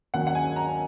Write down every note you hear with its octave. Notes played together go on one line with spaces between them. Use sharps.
D#2 D#3 F#3 C#4 F#5
F#5
G#5
A#5